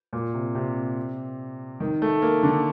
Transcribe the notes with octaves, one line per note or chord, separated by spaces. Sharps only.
A#2
C3
C3
D#3
A3
A#3
D3